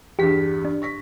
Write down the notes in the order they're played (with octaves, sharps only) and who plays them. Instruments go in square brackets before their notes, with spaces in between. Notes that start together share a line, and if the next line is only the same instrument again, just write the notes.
[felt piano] E2 G2 [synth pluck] G4 B6
[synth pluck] D4
[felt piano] C#6 A#6 B6